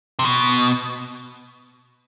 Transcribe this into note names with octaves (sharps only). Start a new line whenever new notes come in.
C3
B2